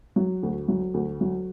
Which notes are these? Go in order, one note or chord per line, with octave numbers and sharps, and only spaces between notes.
F#3
D2
F#3
D2
F#3